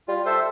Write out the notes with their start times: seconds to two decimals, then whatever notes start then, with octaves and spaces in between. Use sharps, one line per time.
0.08 G3 F4
0.26 A4 C5 E5